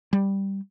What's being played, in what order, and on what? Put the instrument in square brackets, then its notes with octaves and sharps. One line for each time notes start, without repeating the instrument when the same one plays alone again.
[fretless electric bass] G3